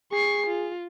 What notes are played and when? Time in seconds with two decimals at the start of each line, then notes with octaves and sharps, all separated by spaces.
0.12 G#4 C#6 C7
0.46 F4